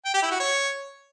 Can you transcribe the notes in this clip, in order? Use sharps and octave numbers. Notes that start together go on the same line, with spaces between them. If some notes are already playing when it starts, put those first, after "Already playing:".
G5
G4
E4
F#4
C#5